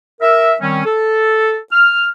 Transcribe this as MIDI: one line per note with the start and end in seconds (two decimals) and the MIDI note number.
0.21 0.53 70
0.21 0.53 76
0.60 0.80 51
0.60 0.80 55
0.60 0.80 60
0.60 0.80 61
0.85 1.56 69
1.71 2.07 89